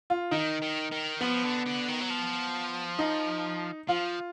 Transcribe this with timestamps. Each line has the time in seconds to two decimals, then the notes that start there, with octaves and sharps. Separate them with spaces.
0.10 F4
0.31 D#3 D#4
0.62 D#3
0.92 D#3
1.21 F3 B3
1.44 D3
1.66 D3
1.88 D#3
2.01 F#3
2.10 F3
2.99 D#4
3.88 F3 F4